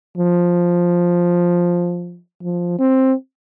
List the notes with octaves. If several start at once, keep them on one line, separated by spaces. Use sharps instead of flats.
F3
F3
C4